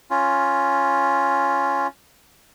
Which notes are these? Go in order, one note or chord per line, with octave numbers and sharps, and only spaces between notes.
C#4 F4